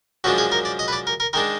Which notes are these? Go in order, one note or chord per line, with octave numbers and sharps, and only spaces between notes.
F#2 F3 G#3 D4 F#4
G#4
A#4
D5
D#5
B4
D5
A#4
A#4
D#3 G#3 D4 A#4